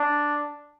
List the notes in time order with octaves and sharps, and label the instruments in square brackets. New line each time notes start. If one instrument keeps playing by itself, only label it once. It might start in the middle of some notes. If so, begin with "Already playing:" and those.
Already playing: [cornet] D4